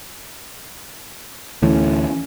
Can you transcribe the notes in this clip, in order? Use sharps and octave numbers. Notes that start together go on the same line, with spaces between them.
D2 A2 E3 C#4